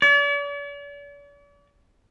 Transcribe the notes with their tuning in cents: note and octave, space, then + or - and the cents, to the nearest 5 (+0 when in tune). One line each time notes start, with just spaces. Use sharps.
D5 -45